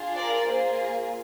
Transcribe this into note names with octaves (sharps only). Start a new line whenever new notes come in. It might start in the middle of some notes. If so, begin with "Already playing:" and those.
Already playing: D4 F4 G#4
A#4 D5
A#3 F4 G#4 C5